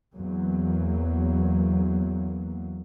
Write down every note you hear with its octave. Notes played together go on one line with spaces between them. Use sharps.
E2 F#3 A#3